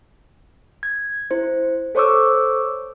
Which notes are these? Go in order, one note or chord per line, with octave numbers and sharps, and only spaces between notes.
G#6
E4 C5
A4 C5 C#5 C#6 D6 E6